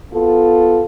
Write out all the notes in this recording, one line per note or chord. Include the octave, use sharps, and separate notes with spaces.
B3 F4 A4